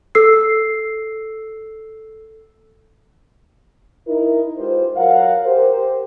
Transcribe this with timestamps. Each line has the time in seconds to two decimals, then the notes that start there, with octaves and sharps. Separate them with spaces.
0.15 A4 E6 C7
4.07 D#4 E4 A#4
4.58 G#3 F4 G4 B4 C5
4.96 F#3 A#4 F5 F#5
5.45 G4 A#4 C5